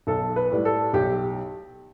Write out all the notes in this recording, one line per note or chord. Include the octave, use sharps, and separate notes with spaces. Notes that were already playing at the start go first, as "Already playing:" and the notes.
B1 A4
B4
A2 G3
A4
B1 G4